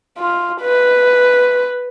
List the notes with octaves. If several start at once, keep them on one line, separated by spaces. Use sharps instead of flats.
F4
B4